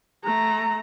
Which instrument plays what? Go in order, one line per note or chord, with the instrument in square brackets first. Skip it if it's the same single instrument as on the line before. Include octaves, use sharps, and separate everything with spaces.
[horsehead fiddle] A3 A#5